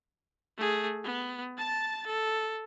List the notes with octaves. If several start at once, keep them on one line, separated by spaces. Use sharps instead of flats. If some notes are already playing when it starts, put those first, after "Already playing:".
A3 G#4
B3
A5 A6
A4